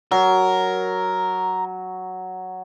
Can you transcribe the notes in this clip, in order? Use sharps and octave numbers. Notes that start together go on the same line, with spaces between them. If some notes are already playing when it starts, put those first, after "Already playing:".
F#3 A#4